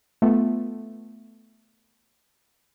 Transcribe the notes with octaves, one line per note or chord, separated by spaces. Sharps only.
A3 B3 F4